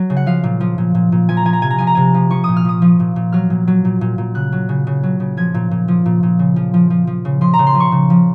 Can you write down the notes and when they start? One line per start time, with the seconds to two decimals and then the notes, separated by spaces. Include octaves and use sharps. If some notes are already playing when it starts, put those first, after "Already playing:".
Already playing: F#3
0.10 C#3
0.17 F#5
0.26 F3 F5
0.44 A#2
0.61 F3
0.78 A#2
0.95 A#2
1.12 A#2
1.29 F3 G#5
1.37 A#5
1.45 F3 G#5
1.53 A#5
1.62 C3 G#5
1.70 A#5
1.78 F3 G#5
1.87 A#5
1.95 C3 G#5
2.15 F3
2.31 F3 C#6
2.44 A#2 D#6
2.57 F6
2.65 F3 D#6
2.82 F3
3.00 A#2
3.16 A#2
3.32 F#3 F6
3.50 A#2
3.67 F#3
3.85 A#2
4.01 A#2
4.18 A#2
4.35 C#3 F#6
4.52 F#3
4.69 C#3
4.87 C#3
5.03 F#3
5.20 C#3
5.37 F3 G#6
5.54 A#2
5.71 A#2
5.88 F3
6.06 A#2
6.23 A#2
6.39 C#3
6.56 F3
6.74 F3
6.90 F3
7.07 F3
7.25 C#3
7.41 F3 C6
7.54 A#5
7.59 C#3
7.67 C6
7.75 F3
7.80 C#6
7.92 C#3
8.10 F3